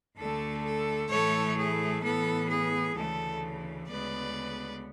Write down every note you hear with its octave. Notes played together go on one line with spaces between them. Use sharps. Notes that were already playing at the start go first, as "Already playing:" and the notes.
D2 D3 A3 A4
A4
A2 E3 A3 A4 C#5
G#4
A2 E3 B3 A4
G#4
D2 C#3 E3 A3 A4
D2 C#3 G#3 B3 B4 D5